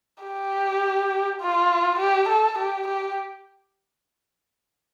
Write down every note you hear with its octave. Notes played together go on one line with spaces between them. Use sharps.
G4
F4
G4
A4
G4
G4